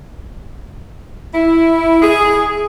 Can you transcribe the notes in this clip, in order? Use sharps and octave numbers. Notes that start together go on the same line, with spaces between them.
E4
G#4